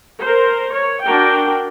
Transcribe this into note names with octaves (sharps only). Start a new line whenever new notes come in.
A#4 C5
C#5
D4 F#4 A#4 G5